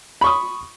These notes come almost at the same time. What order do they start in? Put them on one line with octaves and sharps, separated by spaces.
B5 C#6 D#6